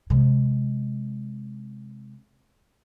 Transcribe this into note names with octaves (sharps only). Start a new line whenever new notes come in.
C3 G#3